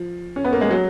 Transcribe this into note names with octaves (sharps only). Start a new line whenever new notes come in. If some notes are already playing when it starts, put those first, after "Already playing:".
Already playing: F3
C#4
B3
A#3
G#3
F#3